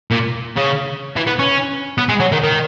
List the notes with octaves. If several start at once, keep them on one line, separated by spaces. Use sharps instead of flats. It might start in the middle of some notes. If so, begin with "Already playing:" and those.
A#2
C#3
E3
B3
C#4
B3
G#3
F#3
D#3
D#3